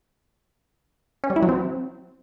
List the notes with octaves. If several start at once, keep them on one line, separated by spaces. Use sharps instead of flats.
C#4
G3
E4
F#3
C4